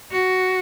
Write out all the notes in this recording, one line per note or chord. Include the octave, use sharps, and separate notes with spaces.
F#4